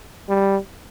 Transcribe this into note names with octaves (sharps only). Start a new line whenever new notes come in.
G3